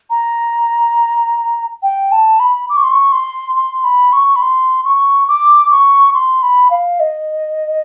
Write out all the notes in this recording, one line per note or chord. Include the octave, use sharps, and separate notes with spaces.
A#5
G5
A5
B5
D6
C#6
C6
C#6
C6
C6
B5
C#6
B5
C6
C#6
D6
C#6
C6
B5
F5
D#5